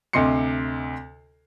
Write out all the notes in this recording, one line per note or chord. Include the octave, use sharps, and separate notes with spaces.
D2 C3 D#5 C6 C7 C#7